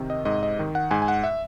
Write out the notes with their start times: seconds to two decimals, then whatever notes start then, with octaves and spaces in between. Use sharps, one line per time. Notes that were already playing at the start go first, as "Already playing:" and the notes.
Already playing: C3 D#3
0.10 D#5
0.25 G#2 D#5
0.43 D#5
0.59 D#3
0.75 F#5
0.91 G#2 G#5
1.02 G#5
1.08 F#5
1.24 E5